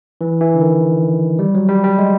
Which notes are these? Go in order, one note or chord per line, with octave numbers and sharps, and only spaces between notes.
E3
E3
D3
D#3
G3
F#3
G3
G3
G#3